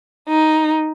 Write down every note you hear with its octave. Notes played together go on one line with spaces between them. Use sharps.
D#4